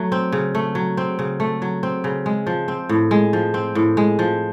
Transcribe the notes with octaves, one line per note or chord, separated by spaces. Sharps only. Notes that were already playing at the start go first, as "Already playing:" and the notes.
Already playing: F#3 A3
C4
C#3
A3
F#3
C4
C#3
A3
F#3
C4
C#3
G#3
F3
C4
A2
G#3
F3
C4
A2
G#3
F3